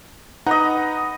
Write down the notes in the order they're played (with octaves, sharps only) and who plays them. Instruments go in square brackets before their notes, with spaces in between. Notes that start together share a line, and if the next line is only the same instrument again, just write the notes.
[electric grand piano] D#4 F#5 A#5 [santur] B4 D#5